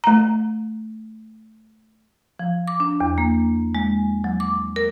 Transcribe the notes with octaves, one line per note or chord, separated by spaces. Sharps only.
A3 A#5
F3
D6
D4
E2
A#3
G#3
F#3
D6
A#4